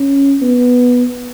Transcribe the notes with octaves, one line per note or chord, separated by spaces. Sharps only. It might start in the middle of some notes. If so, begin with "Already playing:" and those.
Already playing: C#4
B3